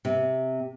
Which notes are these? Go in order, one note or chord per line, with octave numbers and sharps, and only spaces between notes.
C3